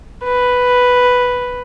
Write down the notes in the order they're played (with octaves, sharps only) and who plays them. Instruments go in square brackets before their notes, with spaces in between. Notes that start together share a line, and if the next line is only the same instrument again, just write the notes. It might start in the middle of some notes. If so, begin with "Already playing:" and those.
[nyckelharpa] B4